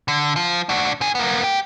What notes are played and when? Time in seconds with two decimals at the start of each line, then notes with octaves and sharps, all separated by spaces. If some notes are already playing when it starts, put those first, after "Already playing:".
0.08 D3
0.36 F3
0.69 D4 F#4
1.01 D#3 G#4
1.15 A#3 B3
1.44 G4